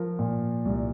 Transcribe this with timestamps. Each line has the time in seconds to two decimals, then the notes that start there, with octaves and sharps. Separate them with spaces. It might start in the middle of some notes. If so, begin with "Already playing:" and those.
Already playing: F3 A#4
0.19 A#2
0.65 C2